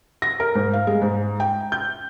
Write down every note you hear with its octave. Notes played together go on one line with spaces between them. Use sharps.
A#6
A#4
G#2
F5
G#3
G#2
G5
G6